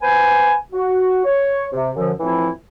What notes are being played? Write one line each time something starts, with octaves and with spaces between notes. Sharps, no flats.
B3 B4 C5 G#5
F#4
C#5
C3
F#2 D3 F3
A2 E3 F3 C4 E4 F4